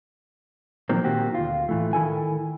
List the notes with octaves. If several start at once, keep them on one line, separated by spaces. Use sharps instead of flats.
A#2 D#3 F3 F#3 A#3 C4
A#2 D#3 A#3 C4 F#4 G4
D2 F4
A2 E3 A3
D#3 E4 A4 G#5